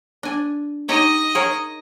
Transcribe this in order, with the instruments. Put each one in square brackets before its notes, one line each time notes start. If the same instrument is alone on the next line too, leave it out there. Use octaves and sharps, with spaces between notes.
[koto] D4 G#5
[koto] D#4 G4 C#5 [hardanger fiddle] D#5
[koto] G#4 A#4 C#5